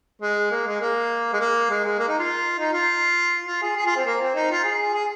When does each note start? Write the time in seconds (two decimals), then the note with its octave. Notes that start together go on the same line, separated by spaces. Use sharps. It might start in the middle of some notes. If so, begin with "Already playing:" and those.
0.22 G#3
0.51 A#3
0.67 G#3
0.81 A#3
1.33 G#3
1.40 A#3
1.70 G#3
1.84 G#3
1.99 A#3
2.09 D#4
2.19 F4
2.59 D#4
2.73 F4
3.47 F4
3.62 G#4
3.76 G#4
3.86 F4
3.96 C4
4.06 A#3
4.21 C4
4.35 D#4
4.51 F4
4.64 G#4
4.94 G#4